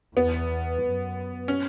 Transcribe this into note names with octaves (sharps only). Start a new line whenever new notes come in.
E2 B3
F#2
C#4